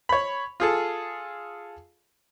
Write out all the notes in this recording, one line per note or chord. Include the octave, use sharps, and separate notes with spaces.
C#5 B5
F4 G#4 A4